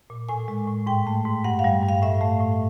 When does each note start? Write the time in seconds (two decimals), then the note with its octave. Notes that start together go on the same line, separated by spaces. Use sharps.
0.10 A#2
0.29 A2 G#5
0.48 G#3
0.67 A2
0.87 G#2 G5
1.07 A3
1.25 G#2
1.44 G2 F#5
1.59 F5
1.64 G3
1.83 G2
1.89 F5
2.02 A2 E5
2.21 A3
2.41 A2